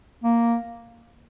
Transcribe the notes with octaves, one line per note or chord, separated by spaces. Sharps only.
A#3